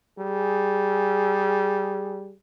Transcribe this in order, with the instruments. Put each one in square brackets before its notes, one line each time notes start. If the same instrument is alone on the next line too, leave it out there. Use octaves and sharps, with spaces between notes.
[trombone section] G3 G#4